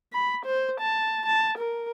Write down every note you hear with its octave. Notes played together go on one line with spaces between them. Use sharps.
B5
C5
A5
A5
A#4